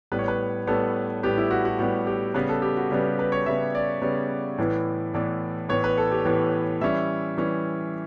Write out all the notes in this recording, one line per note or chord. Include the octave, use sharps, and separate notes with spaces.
A2 G3 B3 B4
C#5
B4
A2 G3 B3 A4
A2 G3 B3 G4
E4
F#4
F#4
A2 G3 B3 F#4
G4
C#3 G3 B3 B4
A4
G4
F#4
C#3 G3 B3
G4
B4
C#5
C#3 G3 B3 E5
D5
C#3 G3 B3
A2 E3 B3
A2 E3 B3 D5
A2 E3 B3 C#5
B4
A4
G4
A2 E3 B3
E3 G3 C#4 E5
E3 G3 C#4